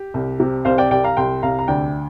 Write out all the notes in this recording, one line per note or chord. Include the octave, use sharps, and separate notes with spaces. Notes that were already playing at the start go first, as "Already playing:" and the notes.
Already playing: G4
C2
C3
C2 C5 F5
D5 G5
C2 D5 G5
F5 A#5
C2 G5 C6
C2 F5 A#5
A#5
D2 D5 G5